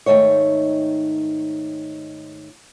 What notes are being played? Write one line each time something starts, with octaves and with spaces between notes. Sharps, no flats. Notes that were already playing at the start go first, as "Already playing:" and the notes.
G#2 D#3 A3 D#4 C#5